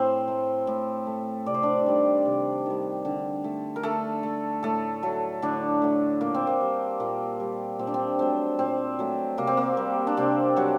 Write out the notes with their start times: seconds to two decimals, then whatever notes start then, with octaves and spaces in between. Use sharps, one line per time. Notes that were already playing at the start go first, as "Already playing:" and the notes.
Already playing: A2 C4 C5
0.28 A3
0.67 A2
1.07 A3
1.46 C3 D5
1.54 C5
1.62 D4 D5
1.86 D#3 G3
2.25 C3
2.66 D#3 G3
3.05 D3
3.44 A3
3.76 A#4
3.83 D3 A3 A4
4.23 A3
4.63 A2 A3 A4
5.03 F#3 A3
5.42 A2 D3 D4
5.82 F#3 A3
6.21 A#2 A#3
6.34 C4
6.47 A#3
6.61 G3
7.00 A#2 A#3
7.40 G3
7.79 A#2 C4
7.87 D4
7.94 C4
8.19 F#3 A3 C4
8.59 A#2 C4
8.99 F#3 A3
9.38 C3 A#3
9.47 C4
9.57 A#3
9.77 G3
10.07 D4
10.17 C3 C4
10.57 F#3 G3 F#4